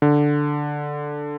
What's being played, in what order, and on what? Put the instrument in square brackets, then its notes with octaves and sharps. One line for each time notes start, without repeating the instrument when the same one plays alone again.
[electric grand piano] D3